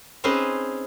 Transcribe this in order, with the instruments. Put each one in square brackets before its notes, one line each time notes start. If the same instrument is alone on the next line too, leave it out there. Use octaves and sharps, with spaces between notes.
[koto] C4 C#4 D#4 G#4 B4 C5